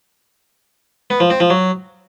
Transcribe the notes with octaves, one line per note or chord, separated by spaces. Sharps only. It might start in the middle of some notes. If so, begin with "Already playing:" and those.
B3
F3
C4
F3
F#3